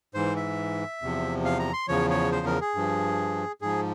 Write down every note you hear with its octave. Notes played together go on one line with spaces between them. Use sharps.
G#2 E3 C5
E5
E2 C3 F3
F5
A#5
C6
E2 C#3 F3 C#5
C#5
C5
A#4
G#4
G2 F3
G#2 F3 G#4